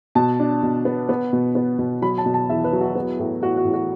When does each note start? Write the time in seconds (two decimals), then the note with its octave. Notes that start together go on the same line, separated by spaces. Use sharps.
0.15 B2 A5
0.39 D4
0.63 B2
0.85 B3
1.09 B3
1.33 B2
1.55 B3
1.79 B2
2.02 F#3 B5
2.18 A5
2.26 B2
2.34 A5
2.49 E2 E5
2.64 B4
2.73 F#3
2.81 F#4
2.95 B3
3.19 A2
3.42 A2 F#4
3.57 F#4
3.65 A2
3.74 F#4